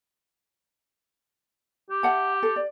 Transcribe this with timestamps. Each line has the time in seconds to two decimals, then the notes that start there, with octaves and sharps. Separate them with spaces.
1.90 G4
2.03 E5 F#5 A5
2.43 A4
2.56 D5